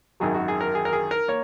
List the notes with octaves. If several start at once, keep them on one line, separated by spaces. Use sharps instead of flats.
G#1 F#2 D#3 F#3 G#4
F#4
G#4
A#4
G#4
A#4
G#4
A#4
A#3 C#5